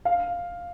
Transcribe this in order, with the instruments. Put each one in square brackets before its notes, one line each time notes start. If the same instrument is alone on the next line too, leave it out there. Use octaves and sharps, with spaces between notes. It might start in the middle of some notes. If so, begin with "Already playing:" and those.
[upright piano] F5